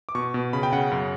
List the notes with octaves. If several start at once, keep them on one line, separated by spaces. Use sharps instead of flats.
D6
B2 C#6
B2
C#3 B5
G5
C#3 F#5
F#2